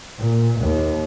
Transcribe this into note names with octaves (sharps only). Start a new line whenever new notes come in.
A#2
D#2